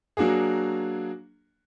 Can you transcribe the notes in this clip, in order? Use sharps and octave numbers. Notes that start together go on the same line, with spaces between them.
F#3 A#3 D4 F#4 G#4